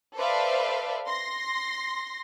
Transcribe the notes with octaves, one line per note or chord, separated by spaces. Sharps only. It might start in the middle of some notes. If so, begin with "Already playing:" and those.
A4 B4 C5 D5 E5 F5
C6 A#6